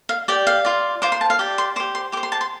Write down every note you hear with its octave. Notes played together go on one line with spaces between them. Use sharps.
F5
G4 D5 G5
F5
F4 D5
F4 C5 D6
C6
A5
F5
G4 D5
C6
G4 C5 D6
C6
G4 C5 D6
C6
A5
C6